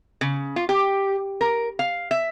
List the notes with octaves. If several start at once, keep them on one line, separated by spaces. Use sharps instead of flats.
C#3
F4
G4
A#4
F5
E5